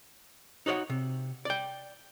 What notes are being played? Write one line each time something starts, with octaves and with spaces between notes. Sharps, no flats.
D#4 F#4 C#5 D5 F#5
C3
D5 G5